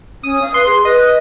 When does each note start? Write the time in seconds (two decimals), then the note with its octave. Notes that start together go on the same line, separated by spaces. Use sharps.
0.23 C#4 D#6
0.42 F5
0.54 B4 C6
0.66 G#4
0.85 B4 D#5